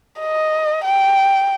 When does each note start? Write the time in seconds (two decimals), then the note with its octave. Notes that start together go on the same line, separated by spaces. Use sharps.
0.21 D#5
0.84 G5